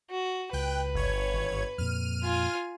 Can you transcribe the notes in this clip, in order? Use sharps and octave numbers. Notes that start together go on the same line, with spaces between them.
F#4
C#2 B4 G5 F#6
G1 C#5 G#6
G#1
F2 A#2 F6 D#7
F4 G#5